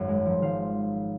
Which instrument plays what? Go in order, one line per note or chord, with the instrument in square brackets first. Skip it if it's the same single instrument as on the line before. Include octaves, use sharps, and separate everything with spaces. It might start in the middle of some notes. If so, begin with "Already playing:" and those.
Already playing: [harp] G#1 F#2
G#3
F3
G#1 F5